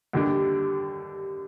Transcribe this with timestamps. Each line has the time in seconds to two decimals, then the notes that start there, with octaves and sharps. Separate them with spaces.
0.13 D#2 D3 G3 D4